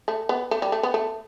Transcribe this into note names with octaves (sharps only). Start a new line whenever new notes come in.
A3
B3
A3
G3
A3
B3
A3